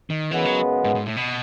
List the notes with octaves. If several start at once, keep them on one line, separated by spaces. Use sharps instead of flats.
D#3
F#2 C#3 E3 G#3 B3
F#3
G#2
G#2
A2
B2